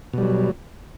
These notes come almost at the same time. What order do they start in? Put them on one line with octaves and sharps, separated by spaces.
B2 G3 F#3